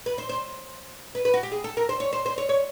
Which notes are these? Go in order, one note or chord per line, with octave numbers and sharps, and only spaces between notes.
B4
C5
C5
B4
B4
F#4
G4
G#4
A4
A#4
C5
C#5
C5
C5
C#5
C#5